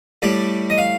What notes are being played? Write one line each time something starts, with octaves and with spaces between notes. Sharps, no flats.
A2 G3 D5
D#5
F5